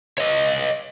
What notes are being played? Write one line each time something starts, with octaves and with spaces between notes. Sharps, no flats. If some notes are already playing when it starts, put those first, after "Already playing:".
C#5 D#5